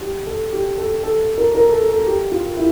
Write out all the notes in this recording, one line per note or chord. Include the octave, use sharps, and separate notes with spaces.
G4
A4
G4
A4
A4
A#4
A#4
A4
A4
G4
F4
E4